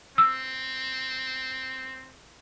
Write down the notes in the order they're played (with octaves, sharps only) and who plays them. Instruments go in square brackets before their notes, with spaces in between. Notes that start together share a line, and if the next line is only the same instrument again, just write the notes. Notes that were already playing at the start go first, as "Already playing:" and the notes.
[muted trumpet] C4 [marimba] E6